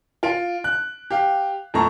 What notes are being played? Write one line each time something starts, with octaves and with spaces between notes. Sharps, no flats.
F4 D7
F#6
G4 F5
F2 A3 A#5 C#6